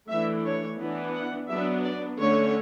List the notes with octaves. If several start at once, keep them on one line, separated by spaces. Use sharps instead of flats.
E3 A3 D4 E5
C#5
E3 B3 D4
F#5
F#3 B3 D4 E5
D5
D3 A3 C#4 C#5